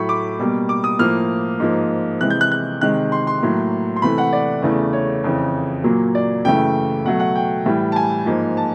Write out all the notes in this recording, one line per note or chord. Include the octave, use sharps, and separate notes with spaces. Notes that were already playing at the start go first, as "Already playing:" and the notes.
Already playing: A2 F#3 A3 B5 C#6
D6
B2 G3 A#3
D6
D#6
A2 F3 A#3 F6
G#2 F3 A#3
C3 E3 G#3 F#6
G6
F#6
F#6
C3 D#3 G#3 F#6
C6
C6
A2 F#3 A#3
C6
C3 E3 A3 B5
F#5
D5
E2 C#3 E3 A3
C#5
F2 C#3 E3
A#2 F#3 A#3
D5
F#2 C#3 E3 A3 G5
B2 F#3 A3 F#5
F#5
G5
A2 E3 G3
A5
G#5
G#2 F3 A#3
A5